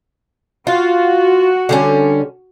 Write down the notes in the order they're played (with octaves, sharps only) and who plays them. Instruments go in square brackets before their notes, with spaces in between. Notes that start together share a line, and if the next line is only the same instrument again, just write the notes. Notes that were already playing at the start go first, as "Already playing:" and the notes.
[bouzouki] F4 [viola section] F#4
[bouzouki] D3 G3 C#4